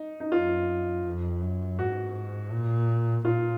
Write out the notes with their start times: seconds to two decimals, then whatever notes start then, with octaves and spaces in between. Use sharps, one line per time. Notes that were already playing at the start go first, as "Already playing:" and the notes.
Already playing: D#4
0.20 D#4
0.32 F#2 F4
1.06 F2
1.42 F#2
1.78 G#2 F#4
2.51 A#2
3.25 A#2 F4